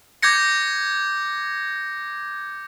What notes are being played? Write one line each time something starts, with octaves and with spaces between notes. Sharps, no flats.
D6 G6 G#6 A#6 C#7